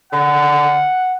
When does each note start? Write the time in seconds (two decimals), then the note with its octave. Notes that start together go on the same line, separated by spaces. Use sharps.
0.13 D3 F#5